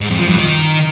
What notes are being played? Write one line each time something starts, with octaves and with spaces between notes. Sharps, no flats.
G#2
F2
F3
G2
D#3